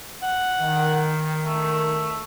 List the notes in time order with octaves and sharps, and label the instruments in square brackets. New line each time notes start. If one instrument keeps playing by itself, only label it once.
[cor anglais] F#5
[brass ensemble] D#3
[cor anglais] A3